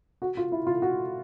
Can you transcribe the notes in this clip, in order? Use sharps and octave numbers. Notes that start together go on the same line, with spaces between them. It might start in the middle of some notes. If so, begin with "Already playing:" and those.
F#4
F4
E4
F4
F#4